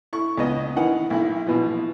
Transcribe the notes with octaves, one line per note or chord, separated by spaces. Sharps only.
E4 C#6
C#2 C#3 B3 D#5
D#3 E3 F#5
B1 E4
B2 E3 F3